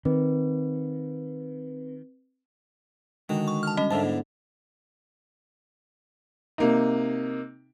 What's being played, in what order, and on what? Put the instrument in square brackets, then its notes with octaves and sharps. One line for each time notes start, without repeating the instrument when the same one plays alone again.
[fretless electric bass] D#3 [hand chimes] C4 B4
[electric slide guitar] D3 G#3 F#4 [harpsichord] D#3
[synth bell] C#6
A5 F6
G3 C#4 D#5
[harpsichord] G#2 D3 [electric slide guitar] A#4 E5 A5
[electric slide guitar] B3 E4
[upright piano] C3 A#3 D#4